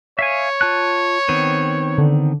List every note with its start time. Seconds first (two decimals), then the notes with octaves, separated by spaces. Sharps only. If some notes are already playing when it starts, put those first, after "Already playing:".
0.19 C#5 E5 F5 G#5
0.61 F4 A5 F#6
1.29 D#3 B3 C4
1.98 D3